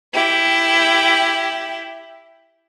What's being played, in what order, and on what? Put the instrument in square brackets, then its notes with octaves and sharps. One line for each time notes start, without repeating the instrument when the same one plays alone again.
[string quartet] E4 G4